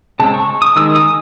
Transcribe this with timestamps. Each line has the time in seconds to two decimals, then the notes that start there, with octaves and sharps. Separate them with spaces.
0.20 C#3 G#3 C4 A5
0.34 C#6
0.62 D#6
0.76 D#3 G#3 E6
0.95 D#6